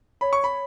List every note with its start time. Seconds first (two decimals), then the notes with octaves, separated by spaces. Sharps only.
0.21 C#5 B5
0.33 C#6
0.44 B5